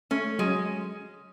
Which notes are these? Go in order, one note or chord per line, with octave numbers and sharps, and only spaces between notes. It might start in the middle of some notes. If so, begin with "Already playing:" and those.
A3 C#4
F#3 G#3